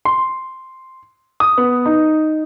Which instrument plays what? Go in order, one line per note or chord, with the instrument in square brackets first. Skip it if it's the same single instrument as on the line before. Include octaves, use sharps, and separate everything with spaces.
[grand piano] C6
D#6
B3
D#4